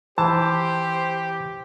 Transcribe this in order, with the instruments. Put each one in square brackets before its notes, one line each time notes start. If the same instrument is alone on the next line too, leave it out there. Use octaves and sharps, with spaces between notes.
[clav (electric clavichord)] E3 [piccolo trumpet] G4 [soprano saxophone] C5 [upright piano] A5